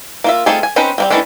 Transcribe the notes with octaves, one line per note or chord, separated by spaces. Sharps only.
A#3 F4 E5
A3 C4 D#4 F4 G#4
G#5
C4 C#4 D#4 B4 C5
G3 A#3 C4
D#3 E3 A3 C#4 D4